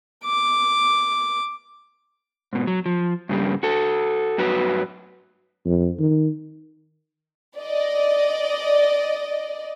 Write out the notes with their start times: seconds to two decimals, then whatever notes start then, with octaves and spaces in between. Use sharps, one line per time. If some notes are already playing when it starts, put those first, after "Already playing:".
0.24 D6
2.53 G#2 B2
2.67 F#3
2.86 F3
3.29 G2 C#3 G3 A#3
3.63 F#4 A4
4.38 G2 F#3 F#4 B4
5.66 F2
5.99 D#3
7.57 D5 D#5